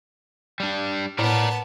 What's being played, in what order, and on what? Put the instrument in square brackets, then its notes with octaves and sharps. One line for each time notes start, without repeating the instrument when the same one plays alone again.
[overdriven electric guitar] G3 D4
[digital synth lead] A2 [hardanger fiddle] B3 A5 [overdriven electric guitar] A#4 D5